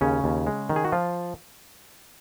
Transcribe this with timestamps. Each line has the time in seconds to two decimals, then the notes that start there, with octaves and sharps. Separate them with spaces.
0.01 D#2 C#3 C#4
0.24 D#2
0.47 G#3
0.69 D#3
0.76 G#4
0.85 F#4
0.92 F3 F4